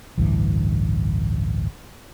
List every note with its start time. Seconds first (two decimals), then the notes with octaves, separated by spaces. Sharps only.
0.18 A1 D2 G2 E3